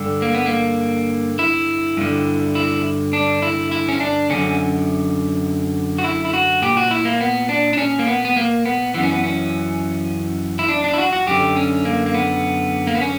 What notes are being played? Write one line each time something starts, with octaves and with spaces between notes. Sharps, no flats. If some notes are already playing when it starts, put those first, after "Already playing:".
Already playing: G2 D3
A#3
B3
A#3
E4
G2 D3
E4
D4
E4
E4
C#4
D4
F#2 D3 C#4
F#4
E4
E4
F#4
A#2 G4
F#4
E4
A#3
B3
D4
D4
C#4
A#3
B3
B3
A#3
B3
F#2 E3 B3
C#4
B3
C#4
E4
D4
D4
E4
F#4
F#4
F#2 D3 G4
C#4
A#3
A#3
B3
A#3
B3
C#4